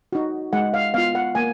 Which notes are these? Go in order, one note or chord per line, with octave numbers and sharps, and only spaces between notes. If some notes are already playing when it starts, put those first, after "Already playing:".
D#4 F#4
G#3 F#5
F5
B3 F4 F5
F#5
A#3 G#5